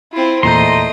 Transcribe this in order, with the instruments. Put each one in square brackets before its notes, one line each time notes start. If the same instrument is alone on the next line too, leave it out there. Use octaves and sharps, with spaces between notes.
[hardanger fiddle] C4 F4 [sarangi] E4
[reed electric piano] E2 A#2 G6 [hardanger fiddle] A3 D#5 [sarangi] A#5 [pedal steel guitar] C6